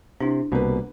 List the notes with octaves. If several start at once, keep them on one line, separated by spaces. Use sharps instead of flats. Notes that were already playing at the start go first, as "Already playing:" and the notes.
C3 D4 E4
C2 B2 A#3 B4